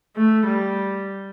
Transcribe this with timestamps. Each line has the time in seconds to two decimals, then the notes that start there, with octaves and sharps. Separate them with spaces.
0.16 A3
0.46 G3